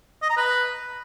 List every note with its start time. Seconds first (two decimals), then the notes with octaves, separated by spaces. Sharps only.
0.22 D#5
0.30 A#5
0.37 B4